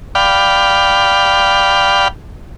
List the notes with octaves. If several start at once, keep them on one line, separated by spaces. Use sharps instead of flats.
D5 F5 G5 B5